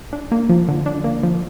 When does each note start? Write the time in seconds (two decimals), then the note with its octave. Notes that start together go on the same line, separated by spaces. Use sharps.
0.13 D4
0.32 A#3
0.49 F3
0.69 D3
0.86 D4
1.04 A#3
1.23 F3